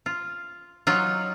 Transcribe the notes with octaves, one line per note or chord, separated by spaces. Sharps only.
F4
F#3 D#4 F4